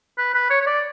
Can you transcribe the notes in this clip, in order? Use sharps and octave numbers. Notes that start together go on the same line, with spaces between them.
B4
B4
C#5
C#5
D5